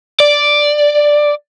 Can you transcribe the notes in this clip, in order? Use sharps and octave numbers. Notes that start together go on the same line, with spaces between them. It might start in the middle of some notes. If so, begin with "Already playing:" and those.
D5